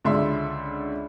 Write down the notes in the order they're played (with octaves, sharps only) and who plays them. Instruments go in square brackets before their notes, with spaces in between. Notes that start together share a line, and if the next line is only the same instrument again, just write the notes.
[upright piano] C#2 D3 D4 E5 C6